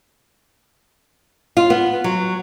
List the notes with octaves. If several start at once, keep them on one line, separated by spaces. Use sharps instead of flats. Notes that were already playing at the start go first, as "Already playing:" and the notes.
F4
B3
F#3